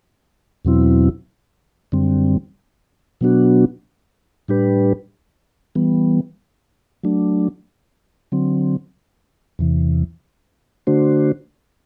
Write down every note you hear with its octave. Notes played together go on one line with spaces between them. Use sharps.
E2 B2 F#3 C4 E4
F#2 D3 G3 C4
B2 F#3 B3 D4 F#4
A2 G3 D4 G4 B4
E3 G3 B3
F#3 A3 D4
D3 F#3 C4
E2 C3 E3
D3 A3 D4 F#4 C5